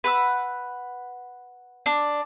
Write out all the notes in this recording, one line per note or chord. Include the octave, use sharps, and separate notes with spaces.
B4 F#5 E6
D4